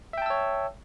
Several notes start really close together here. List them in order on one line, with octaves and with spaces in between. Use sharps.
E5 G5 A5 E6 C#5